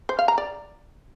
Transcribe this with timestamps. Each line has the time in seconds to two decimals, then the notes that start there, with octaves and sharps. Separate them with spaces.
0.09 C5
0.19 F5
0.28 A#5
0.38 D5